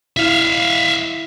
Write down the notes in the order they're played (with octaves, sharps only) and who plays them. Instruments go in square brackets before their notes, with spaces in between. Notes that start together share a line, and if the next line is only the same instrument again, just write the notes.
[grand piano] E4 [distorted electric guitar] E5 F5